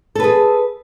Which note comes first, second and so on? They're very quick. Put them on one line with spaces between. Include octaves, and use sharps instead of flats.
A4 B4 G#4